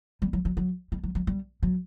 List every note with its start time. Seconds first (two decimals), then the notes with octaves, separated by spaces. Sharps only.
0.22 G3
0.33 F#3
0.45 F#3
0.57 F#3
0.92 G3
1.03 F#3
1.15 F#3
1.27 G3
1.63 F#3